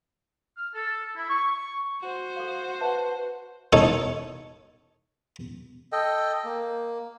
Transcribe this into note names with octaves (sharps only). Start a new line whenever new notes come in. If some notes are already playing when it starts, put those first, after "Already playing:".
F6
A4
E4
C#6
F#4 C5
A4 F5
B4 E5 F#5 A5
D#4 A4 C#5
A4 D#5 G5
A#3